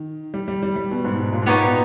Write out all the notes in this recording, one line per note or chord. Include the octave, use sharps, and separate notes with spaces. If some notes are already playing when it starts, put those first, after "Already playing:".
Already playing: D#3
G3
G3
G3
G3
B2
G#2
G#2
A#2
G#2
A#2 B3 D#4 G4 C#5
B2